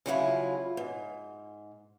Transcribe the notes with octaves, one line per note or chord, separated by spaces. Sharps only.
C#3 F3 F#3 G#3 E4 F4
G#2